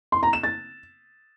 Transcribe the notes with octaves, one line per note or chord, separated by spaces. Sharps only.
C6
A#5
E7
A6